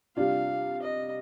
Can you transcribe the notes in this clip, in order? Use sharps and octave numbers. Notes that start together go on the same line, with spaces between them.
C3 G3 D4 F4 F5
D#5